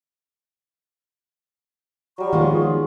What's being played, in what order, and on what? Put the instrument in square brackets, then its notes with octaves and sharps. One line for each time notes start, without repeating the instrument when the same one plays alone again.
[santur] F#3 G3 [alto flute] C#6
[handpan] D#3 [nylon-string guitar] F3 G#3 B3 [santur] F4
[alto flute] G#4